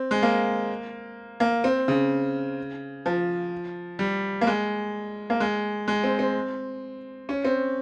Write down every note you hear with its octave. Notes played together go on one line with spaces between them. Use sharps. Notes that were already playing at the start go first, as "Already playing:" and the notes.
Already playing: C4
G#3
A#3
A#3
C4
C#3
F3
G3
A#3
G#3
A#3
G#3
G#3
C4
C4
C#4
C4